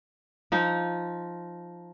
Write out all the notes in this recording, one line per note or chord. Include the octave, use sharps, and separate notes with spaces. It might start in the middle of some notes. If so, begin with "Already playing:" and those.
F3 D#4